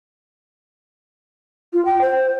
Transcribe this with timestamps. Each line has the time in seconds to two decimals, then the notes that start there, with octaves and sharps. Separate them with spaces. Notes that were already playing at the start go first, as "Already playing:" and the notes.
1.73 F4
1.85 G5
2.01 C5